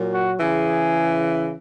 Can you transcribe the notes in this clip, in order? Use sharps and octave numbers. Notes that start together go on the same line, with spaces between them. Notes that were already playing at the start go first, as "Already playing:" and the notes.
Already playing: A#2 F#3
F#4
C#3 E3 G#4